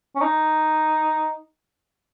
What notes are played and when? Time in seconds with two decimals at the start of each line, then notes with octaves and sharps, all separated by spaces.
0.16 C#4
0.22 D#4